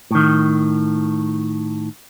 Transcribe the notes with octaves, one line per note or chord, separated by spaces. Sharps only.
A2 D#3